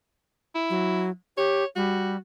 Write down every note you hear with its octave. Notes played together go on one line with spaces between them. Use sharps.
E4
F#3
G4 C#5
G3 F#4